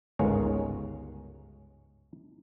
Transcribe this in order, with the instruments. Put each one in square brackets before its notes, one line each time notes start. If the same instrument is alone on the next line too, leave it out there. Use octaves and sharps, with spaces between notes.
[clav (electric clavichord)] G1 C#2 G#2 G#4 A#4 C#5